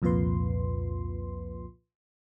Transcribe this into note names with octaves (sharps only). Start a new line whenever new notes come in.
C2 F2 A#2 F4 B4 C6